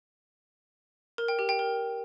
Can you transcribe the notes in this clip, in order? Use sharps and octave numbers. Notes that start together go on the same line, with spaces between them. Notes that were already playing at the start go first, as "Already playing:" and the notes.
A#4
G5
G4
G5
A#4